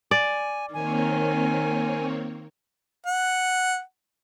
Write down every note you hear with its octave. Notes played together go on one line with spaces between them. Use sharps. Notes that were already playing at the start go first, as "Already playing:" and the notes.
D5 G#5
D#3 A#3 C4 C#5 G#5
F#5